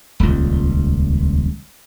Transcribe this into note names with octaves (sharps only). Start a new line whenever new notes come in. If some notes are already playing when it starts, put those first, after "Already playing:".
D#1 C#2